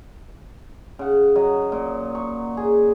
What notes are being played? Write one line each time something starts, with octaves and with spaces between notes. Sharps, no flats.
C#3 F#5
F#3 D#5
A#2
C#6
G#4